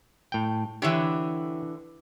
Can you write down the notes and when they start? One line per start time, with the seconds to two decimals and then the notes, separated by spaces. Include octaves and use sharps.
0.32 A2 G5
0.82 D3 E3 G4 C#5 E5